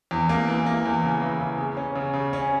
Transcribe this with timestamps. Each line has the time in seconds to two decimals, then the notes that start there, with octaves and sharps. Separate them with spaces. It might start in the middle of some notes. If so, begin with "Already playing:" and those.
0.11 E2
0.29 A#3
0.48 E3
0.66 A#3
0.85 E2
1.04 C#3
1.22 E3
1.40 C#3
1.58 C#3
1.77 C#4
1.95 C#3
2.14 C#3
2.33 C#4